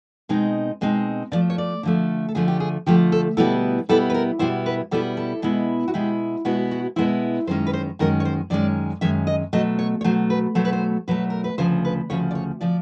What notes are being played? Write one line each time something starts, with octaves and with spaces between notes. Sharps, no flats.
B2 G#3 C4 D#4
B2 G#3 C4 D#4
D3 F3 A3 D5
C#5
D5
D3 F3 A3
A4
D3 F3 A3 G#4
G4
G#4
D3 F3 A3 G4
A4
B2 G3 B3 E4 A4
B2 G3 B3 E4 A4
B4
A#4
B2 G3 B3 E4 C5
B4
B2 G3 B3 E4 A4
A4
B2 G#3 B3 E4
F#4
B2 G#3 B3 E4 G4
B2 G#3 B3 E4 F#4
F#4
B2 G#3 B3 E4 C5
F#2 D#3 G#3 C#4 C5
B4
C5
F#2 D#3 G#3 C#4 A#4
C#5
C5
F#2 D#3 G#3 C#4 D5
F#2 D#3 G#3 C#4 E5
D#5
B2 F#3 A3 D#5
C#5
C#5
B2 F#3 A3 C5
B4
B2 F#3 A3 C5
B4
C5
B2 F#3 A3 B4
A#4
B4
D2 C#3 F3 C5
B4
D2 C#3 F3 C#5
D5
C#5
C#3 F3 D5